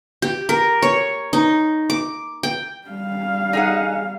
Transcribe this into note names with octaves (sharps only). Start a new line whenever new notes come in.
G4
A#4
C#5
D#4
D6
G5
G3 F5
D#4 G#4 F#5